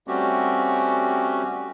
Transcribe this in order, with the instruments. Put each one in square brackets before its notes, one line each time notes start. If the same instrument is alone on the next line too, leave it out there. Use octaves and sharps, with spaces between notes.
[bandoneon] G3 A3 C4 C#4 F#4 G4